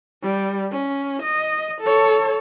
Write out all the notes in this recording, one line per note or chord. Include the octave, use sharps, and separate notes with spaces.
G3
C#4
D#5
A4 C#5